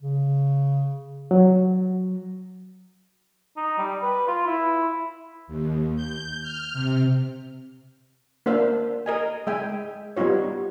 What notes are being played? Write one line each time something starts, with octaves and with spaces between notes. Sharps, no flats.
C#3
F#3
D#4
G3
B4
F4
E4
D#2
G6
F6
C3
A#3 D4 C5 E5 F5
A#4 D#5 G#5
G#3 E5 G5 G#5
G3 B3 D#4 F4 C#5